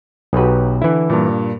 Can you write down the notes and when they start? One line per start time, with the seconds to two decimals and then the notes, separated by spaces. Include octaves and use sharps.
0.33 B1 D#4 F#4 G4 B4
0.81 D3 E3 E4
1.10 G2 A#2